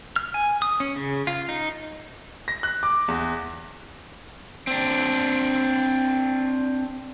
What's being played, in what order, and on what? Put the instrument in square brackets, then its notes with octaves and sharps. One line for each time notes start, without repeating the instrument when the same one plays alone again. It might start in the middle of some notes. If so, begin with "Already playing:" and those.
[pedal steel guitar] F6
G#5
D#6
C#4
C#3
F4
D#4
[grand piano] A#6
F#6
D6
E2
[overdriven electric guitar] C4 D4